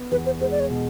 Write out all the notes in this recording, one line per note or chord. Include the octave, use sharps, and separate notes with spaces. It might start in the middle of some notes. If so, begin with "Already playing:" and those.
Already playing: B3
E2 B4
C5
G#3 C5
D5
C#5
B2